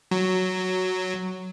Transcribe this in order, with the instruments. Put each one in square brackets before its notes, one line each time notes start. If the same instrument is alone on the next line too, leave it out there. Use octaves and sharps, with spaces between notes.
[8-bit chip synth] F#3